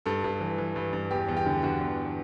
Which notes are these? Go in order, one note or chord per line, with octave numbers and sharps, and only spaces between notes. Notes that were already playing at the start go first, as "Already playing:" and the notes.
G2 A4
G2
E3
E3
G2
G2
E2 G4
E2
G4
D3
D3 F#4
E2